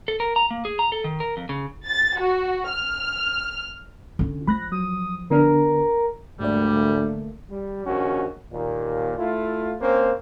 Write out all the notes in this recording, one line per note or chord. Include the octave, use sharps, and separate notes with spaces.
A4
A#4
A#5
A#3
G#4
A#5
A4
D#3
A#4
F2
C#3
A6
F#4
F6
D3 C#4
F3 B5 F#6 A#6
F#3 D#6
D3 B3 D4 A#4
D2 G#2 D3 G3 A3 A#3 D5
G3
A#1 D#2 C#4 F#4
D#2 A#2
A3 E4 F4
A#3 C4 C#4 C5